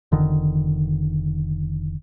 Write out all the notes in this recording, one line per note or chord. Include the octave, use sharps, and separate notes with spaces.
F1 D3 D#3